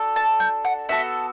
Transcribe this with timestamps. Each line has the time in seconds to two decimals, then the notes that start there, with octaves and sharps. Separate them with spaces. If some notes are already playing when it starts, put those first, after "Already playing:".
Already playing: D4 F#4 A4
0.16 A5
0.40 G5
0.65 F#5
0.89 B3 F#4 A4 E5